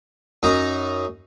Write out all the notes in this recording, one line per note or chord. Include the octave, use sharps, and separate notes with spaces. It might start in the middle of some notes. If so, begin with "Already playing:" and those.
F#2 D#4 A#5